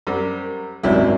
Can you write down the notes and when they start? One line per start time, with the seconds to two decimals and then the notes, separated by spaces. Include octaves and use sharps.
0.07 F#2 G3 A#4 C5
0.83 G#1 F#2 C3 E4 F#4 C#5 D5